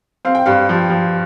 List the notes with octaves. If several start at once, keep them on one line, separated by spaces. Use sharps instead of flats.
C4 F5
G5
G2 F5
F3
F3